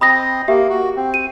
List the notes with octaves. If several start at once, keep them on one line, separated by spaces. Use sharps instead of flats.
C4 D#5 B5 D#6 A#6
A#3 G4 E5
F#4
C4
D#7